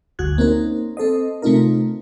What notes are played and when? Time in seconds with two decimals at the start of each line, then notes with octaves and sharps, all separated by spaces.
0.19 G1 D2 F#4 F#6 G#6
0.38 A#3 C4 C#4 D#4 A#4
0.97 C4 A4 C5 D#5
1.42 C3 A3 C4 D#4 F4 A#4